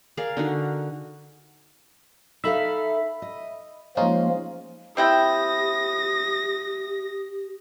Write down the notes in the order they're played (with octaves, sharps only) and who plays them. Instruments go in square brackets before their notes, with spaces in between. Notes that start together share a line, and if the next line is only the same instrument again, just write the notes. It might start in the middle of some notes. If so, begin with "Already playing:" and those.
[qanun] G#4 A#4 D5 F5
D3 D#4 F#4
[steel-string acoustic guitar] D#4 A4 F5 [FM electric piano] E5 B5
[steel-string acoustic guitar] D#5
[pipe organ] F3 A#3 [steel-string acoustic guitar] G#3 [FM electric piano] C#4 D#4 F4
[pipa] C4 E4 G5 [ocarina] G4 [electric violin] D#6 A#6